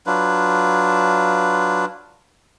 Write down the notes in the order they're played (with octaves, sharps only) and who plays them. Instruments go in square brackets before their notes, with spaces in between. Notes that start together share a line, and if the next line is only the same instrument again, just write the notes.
[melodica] F#3 D4 F4 B4